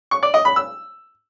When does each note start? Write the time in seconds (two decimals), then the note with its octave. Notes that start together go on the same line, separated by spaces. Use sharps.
0.11 C#6
0.23 D5
0.34 D#5
0.45 B5
0.56 E6